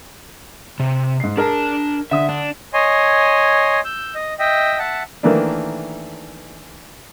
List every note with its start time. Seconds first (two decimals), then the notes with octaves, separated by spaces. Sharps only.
0.80 C3
1.20 G#2 C7
1.37 D4 G#4 A#4 A5
2.11 D3 E5 D#6
2.29 D4
2.74 C#5 D#5 G#5 C6
3.85 E6 G6
4.15 D#5
4.39 D#5 E5 G5
4.79 E5 F#5 A5
5.23 D#3 E3 A3 A#3 D4